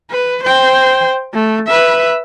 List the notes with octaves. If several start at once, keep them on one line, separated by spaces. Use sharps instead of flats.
B4
C5 G5
A3
B4 E5